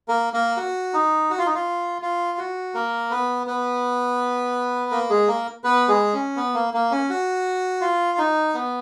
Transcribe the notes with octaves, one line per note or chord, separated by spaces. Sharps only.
A#3 A#4
A#3 A#4
F#4
D#4
F#4
F4
D#4
F4
F4
F#4
A#3 A#4
B3 B4
B3 B4
A#3 A#4
G#3 G#4
A#3 A#4
B3 B4
G#3 G#4
C#4
B3
A#3
A#3
C#4
F#4
F4
D#4
B3